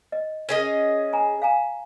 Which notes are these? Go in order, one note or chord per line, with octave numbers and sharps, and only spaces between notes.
D#5
C#4 G#4 A#4 D#5
G#5 A#5 B5
F5 G#5 A#5